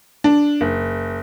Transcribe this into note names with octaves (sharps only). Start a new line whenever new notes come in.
D4
F#1